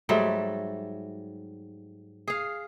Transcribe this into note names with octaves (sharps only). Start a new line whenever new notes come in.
G#2 F#3 G3 A3
G#4 F5